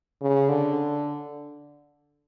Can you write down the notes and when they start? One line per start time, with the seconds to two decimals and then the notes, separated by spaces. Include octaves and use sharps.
0.21 C#3
0.49 D3